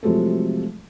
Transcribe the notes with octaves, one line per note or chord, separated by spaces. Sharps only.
C3 F3 F#3 G#3 A3 A4